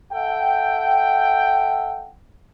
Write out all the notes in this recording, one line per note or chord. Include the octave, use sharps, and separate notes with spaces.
A4 E5 F#5 G5